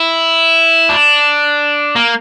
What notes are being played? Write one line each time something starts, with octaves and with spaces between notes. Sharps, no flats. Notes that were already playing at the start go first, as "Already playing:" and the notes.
Already playing: E4
D4
A#3